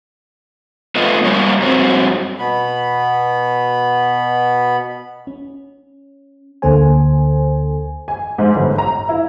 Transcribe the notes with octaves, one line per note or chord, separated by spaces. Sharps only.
A3 B3 F4 B4 D#5
G3 A#3 C#4 A#4 C#5
G2 F#3 C4
B2 B3 B5
C#4
D2 D3 A#3 A4 C5 G#5
G#5
G#2
G1
A#5
E4